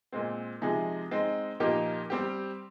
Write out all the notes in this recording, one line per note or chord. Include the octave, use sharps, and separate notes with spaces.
A#2 G#3 C4
C3 F3 G#3 D#4 G#4
G#3 C4 D#4
A#2 F3 A#3 D#4 G4
G3 C4 G4